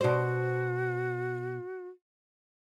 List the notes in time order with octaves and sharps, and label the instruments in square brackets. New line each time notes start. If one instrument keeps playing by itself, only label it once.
[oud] B2 C5 [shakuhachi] F#4